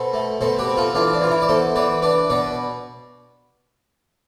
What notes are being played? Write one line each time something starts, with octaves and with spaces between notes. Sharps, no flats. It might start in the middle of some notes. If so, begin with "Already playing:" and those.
Already playing: B2 A4 C5
A3
B2 A4 C5
G4 B4
C4
F4 A4
E3 D4 F4
D4
E3 F4
E4
D5
B3 A4 C5
E3 B4 D5
D4 B4 D5
B2 B4 D5